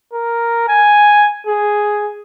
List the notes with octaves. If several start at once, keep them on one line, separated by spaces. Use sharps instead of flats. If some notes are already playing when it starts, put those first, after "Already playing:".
A#4
G#5
G#4